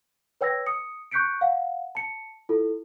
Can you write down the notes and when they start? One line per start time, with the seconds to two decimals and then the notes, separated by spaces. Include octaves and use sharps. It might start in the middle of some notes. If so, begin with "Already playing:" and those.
0.41 B4 C#5 G5 E6 G#6 A#6
0.66 D#6 C#7
1.11 C#6 F#6 G6 B6 C#7 D7
1.41 F5 F#5
1.95 A5 C#7
2.49 E4 F4 A4